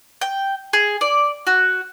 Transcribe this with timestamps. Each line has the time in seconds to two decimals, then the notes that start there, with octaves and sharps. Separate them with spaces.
0.21 G5
0.73 G#4
1.01 D5
1.47 F#4